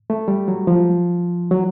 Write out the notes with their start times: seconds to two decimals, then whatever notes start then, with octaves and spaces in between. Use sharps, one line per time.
0.10 A3
0.28 G3
0.48 F#3
0.67 F3
1.51 F#3